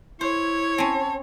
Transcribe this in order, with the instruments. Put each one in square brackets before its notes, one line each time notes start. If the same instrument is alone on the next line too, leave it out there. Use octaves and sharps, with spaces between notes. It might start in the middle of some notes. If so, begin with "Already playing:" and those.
[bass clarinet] E4 [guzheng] C5 [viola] C#5
[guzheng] C4 C#4 [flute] A5